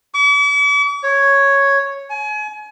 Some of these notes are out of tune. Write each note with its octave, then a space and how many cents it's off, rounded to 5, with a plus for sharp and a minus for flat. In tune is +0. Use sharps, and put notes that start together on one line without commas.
D6 -45
C#5 +0
G#5 +30